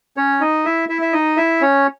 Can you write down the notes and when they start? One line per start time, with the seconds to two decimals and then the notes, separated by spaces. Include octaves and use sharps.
0.17 C#4 C#5
0.40 D#4 D#5
0.65 E4 E5
0.89 E4 E5
1.02 E5
1.13 D#4 D#5
1.37 E4 E5
1.62 C#4 C#5